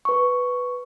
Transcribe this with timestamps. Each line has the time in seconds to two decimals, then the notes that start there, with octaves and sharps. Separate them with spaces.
0.05 B4 C#6